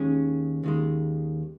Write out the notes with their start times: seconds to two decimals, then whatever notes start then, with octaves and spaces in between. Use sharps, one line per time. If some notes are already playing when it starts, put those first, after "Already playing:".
Already playing: D#2 D#3 G#3 C#4
0.64 D#2 D#3 G#3